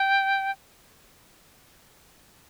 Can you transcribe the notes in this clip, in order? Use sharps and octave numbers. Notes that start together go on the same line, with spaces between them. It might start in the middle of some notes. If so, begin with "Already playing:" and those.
Already playing: G5